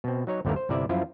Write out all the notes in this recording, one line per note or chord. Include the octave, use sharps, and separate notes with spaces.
B2 C4
F#3 D#4 C#5
G1 D#2 D3 A3 B3 A#4
C5
G1 C3 E4 D5 E5
F#2 F3 E4 F4